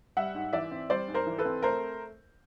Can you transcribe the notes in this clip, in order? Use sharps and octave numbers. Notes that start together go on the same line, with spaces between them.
G3 E5 F#5
G#2
E3 D5 E5
C4
G3 C5 D5
G#2
A#4 C5
E3
A4 B4
C4
A3 A#4 C5